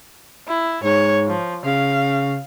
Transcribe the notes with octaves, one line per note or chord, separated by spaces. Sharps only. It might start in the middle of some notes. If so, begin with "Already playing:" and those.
E4
G#2 C#5
F3
C#3 F5